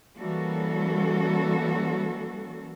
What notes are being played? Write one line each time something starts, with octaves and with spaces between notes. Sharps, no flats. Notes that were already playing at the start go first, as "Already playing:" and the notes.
E3 G3 A#3 C#4 F#4 A4